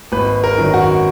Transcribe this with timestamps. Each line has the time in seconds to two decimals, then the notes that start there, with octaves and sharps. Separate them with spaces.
0.12 G#1 B4
0.44 A#4
0.58 F#2 D#3 F#3
0.74 F#4